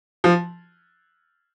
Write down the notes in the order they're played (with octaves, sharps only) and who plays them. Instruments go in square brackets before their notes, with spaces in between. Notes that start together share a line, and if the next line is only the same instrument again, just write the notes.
[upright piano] F3